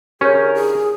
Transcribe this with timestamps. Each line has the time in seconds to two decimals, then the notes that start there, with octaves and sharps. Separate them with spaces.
0.21 D3 C#4 E4 G4 G#4 A#4 C#5
0.55 G#4